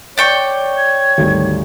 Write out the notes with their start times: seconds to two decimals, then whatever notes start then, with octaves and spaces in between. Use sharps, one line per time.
0.18 C#5 D5 G5 C#6
0.77 G#6
1.18 G#1 D2 G3